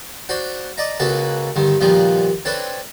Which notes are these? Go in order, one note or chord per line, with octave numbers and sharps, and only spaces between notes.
D4 F#4 C5
D5 D#5 A#5
C#2 A#3 C#4 F#4 A4 B4
G2 D3 D#3
D#2 A#2 F3 G3 B3
C4 D4 A4 B4 C#5